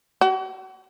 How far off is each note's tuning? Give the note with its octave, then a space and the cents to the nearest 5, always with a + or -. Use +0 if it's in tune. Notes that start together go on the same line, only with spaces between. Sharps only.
F#4 +40